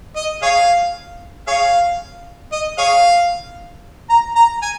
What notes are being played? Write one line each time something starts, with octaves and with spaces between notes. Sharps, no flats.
D#5
G#4 C#5 F5
G#4 C#5 F5
D#5
G#4 C#5 F5
A#5
A#5
G#5